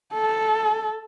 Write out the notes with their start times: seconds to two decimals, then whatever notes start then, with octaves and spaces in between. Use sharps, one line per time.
0.13 A4